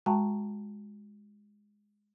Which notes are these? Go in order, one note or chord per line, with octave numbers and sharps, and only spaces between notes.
G#3 F#4 G5 A5 A#5 C#6